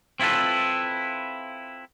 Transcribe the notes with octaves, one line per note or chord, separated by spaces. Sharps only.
C4 E4 F4 A4 B4